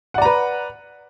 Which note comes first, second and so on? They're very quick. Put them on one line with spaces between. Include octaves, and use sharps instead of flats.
F#5 D5 A#5 B4